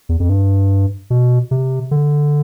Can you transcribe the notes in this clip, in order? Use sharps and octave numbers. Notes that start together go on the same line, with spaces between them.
E2
F2
G2
B2
C3
D3